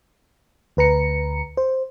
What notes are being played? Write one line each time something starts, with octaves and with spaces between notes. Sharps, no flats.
D2 B4 A#5 C#7
C5